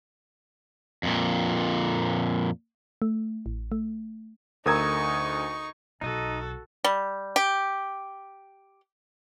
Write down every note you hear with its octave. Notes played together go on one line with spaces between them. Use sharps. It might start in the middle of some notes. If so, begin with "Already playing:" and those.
F2 A#2
A3
A1
A3
D2 D#4 A4 A#4 A#5 C#6 D#6 G#6
B1 D#4 F#4 A4 D#5
G3
G4